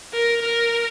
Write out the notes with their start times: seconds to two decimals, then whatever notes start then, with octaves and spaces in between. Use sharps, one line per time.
0.13 A#4
0.41 A#4